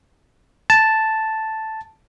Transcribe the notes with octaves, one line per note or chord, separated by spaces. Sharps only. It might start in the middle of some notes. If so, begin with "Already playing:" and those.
A5